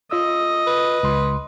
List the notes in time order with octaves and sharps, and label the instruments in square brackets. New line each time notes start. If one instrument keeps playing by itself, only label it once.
[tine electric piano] F4 E6 [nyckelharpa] D#5
[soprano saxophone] B4
[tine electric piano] C#2 C6